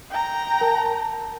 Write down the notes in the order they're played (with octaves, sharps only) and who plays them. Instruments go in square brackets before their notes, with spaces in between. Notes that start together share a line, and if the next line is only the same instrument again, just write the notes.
[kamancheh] G5 A#5
[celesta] A#4 A5